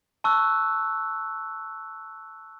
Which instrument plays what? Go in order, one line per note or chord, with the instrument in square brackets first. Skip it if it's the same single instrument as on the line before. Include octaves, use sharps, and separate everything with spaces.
[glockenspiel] A5 C#6 E6 F#6